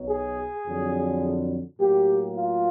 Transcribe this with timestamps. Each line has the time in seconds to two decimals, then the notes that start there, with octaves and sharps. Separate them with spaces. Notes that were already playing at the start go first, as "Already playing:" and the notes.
Already playing: B1 B2 F#3
0.09 G#4
0.66 F2 D3 F#3
1.79 A2 F#3 A#3 G4
2.36 F4